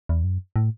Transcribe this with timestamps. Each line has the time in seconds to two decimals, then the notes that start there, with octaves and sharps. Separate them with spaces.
0.09 E2
0.24 F#2
0.56 A2